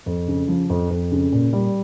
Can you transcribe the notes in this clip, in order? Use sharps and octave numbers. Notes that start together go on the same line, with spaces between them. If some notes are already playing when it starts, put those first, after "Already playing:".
F2
C#3
F3
F2
F2
C#3
A#2
G3